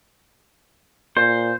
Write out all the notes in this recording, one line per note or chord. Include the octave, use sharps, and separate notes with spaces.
A#2 C5